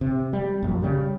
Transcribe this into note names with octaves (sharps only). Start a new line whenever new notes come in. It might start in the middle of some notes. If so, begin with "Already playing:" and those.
C3
G3
A#1 F#2
C#3 G3